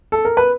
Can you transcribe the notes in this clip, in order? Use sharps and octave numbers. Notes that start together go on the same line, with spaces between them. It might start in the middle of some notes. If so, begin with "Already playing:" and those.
A4
A#4
B4